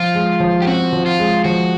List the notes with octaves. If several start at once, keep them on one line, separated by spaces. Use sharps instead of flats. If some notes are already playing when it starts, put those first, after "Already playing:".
Already playing: F3 F4
G#3
F3
G4
C4 F#4
F3
F4
G#3
F3 F#4